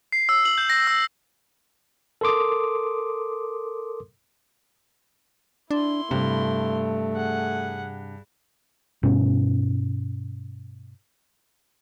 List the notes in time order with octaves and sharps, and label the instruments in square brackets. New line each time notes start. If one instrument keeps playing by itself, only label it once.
[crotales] C7
E6
F#7
G6
A#6
E6
[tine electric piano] A4 A#4 C6 D6 D#6
[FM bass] D4 [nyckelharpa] E4 C6
[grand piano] G2 [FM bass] C3 [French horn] A3
[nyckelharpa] G#4 F#5
[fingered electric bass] G2 B2 C#4